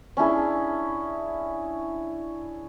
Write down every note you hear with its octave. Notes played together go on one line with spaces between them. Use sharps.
C#4 D4 E4 G#4